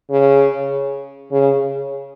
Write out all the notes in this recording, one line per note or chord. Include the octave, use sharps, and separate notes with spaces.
C#3
C#3